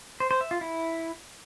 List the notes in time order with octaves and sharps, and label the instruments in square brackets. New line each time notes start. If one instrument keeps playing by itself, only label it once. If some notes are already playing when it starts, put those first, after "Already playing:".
[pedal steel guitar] C5
C5
E5
F4
E4